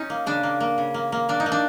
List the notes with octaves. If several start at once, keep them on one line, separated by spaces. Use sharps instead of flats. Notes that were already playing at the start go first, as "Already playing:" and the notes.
Already playing: C#4 D#4
A#3
C#3 D4
A#3
A#3
C#3
A#3
A#3
A#3 D4
D#4
A#3
D4